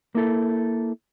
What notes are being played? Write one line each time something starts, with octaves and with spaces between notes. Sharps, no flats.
A#3 E4 A4